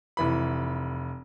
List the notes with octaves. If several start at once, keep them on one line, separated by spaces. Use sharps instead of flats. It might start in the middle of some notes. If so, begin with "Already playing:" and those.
F1 E3 B5